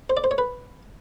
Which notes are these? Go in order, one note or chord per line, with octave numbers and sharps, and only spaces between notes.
C5
D5
C5
C#5
B4